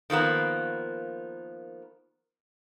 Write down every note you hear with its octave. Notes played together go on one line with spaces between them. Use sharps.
D#3 F3 A#3 B3